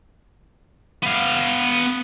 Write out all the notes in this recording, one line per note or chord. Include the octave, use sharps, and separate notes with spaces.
B3 F5